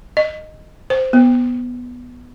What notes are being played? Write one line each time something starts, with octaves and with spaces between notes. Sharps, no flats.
D#5
C5
B3